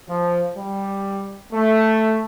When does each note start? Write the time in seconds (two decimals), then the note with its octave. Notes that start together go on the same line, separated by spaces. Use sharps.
0.08 F3
0.56 G3
1.52 A3